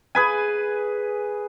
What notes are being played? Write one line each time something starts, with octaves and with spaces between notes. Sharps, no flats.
G#4 B4 G#5